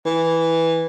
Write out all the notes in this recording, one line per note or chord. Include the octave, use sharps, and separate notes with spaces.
E3